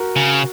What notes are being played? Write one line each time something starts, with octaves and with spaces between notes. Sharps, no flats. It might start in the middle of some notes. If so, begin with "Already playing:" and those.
Already playing: F#4 A#4
C#3